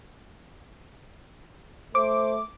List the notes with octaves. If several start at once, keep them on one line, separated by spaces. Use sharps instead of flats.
A3 C5 D6